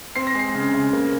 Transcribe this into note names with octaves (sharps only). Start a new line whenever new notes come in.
C4 C7
A#6
G#3 C7
C#3
C#3
A#3